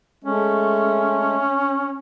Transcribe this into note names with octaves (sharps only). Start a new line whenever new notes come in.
G#3 A3 C#4